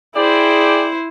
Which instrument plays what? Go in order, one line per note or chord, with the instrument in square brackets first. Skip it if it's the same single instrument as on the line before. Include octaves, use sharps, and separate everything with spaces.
[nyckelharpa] E4 C5 [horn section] G#4 D5 G5